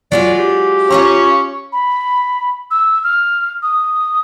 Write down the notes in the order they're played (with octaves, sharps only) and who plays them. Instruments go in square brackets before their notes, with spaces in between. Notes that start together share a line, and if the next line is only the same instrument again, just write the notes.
[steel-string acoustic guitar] F#3 G#3 F4 [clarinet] D5
[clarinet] G4
[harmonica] C#4 C#5 [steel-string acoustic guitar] F4 F5 A#5
[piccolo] B5
E6
F6
D#6